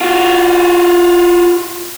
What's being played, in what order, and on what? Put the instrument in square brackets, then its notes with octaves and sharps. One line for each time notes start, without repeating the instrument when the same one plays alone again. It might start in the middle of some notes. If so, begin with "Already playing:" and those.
[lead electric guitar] F4 F#4